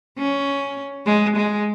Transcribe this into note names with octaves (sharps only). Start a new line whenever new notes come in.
C#4
G#3
G#3